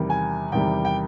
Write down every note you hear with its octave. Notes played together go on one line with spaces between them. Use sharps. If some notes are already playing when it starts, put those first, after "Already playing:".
Already playing: E2 C3 D#3 G3
G#5
E2 C3 D#3 G3 G5
G5